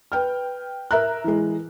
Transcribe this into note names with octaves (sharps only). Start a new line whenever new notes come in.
B4 G5 F6
A#4 E5 A#5 F#6
E3 G#3